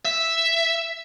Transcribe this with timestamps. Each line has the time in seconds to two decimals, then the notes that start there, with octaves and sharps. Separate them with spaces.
0.05 E5